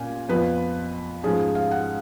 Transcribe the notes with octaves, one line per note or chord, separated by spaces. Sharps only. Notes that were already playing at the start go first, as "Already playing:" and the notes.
Already playing: A#2 A#3 C#4 G#5
F2 F3 B3 B4
G#2 F3 G#3 C#4 G#4
F5
F#5